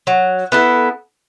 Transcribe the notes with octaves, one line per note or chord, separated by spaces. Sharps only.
F#3
B3 E4 A4